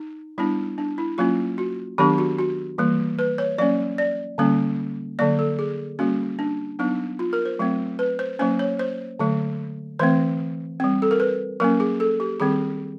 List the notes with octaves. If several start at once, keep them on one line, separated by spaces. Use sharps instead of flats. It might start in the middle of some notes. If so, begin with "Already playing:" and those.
Already playing: D#4
G3 B3 D4 E4
D4
E4
F#3 A#3 C#4 F4
F#4
D#3 F#3 B3 D4 G4
F#4
F#4
E3 G3 A#3
B4
C#5
F#3 A#3 C#4 D5
D5
D3 G3 A#3 C#4
D3 F#3 A#3 D5
A4
G#4
G3 A#3 C#4 F#4
D4
F#3 B3 D4 D#4
F4
A#4
C5
F#3 A3 C4
B4
C5
F#3 A#3 C#4 C5
C#5
C5
D3 F#3 A3
E3 A3 C4 C5
G3 C4
A4
A#4
B4
F#3 A#3 C#4 A#4
G#4
A4
G4
D#3 G3 C4 G#4